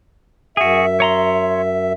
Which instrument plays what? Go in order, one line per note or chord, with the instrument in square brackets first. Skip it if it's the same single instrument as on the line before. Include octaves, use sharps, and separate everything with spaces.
[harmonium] F#2 E5 [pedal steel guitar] F#4 G#4
[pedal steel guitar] C#5 A#5 C6